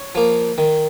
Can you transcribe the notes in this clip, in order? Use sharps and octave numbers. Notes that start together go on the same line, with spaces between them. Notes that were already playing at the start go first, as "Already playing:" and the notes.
Already playing: C#5
F3 A#3
D#3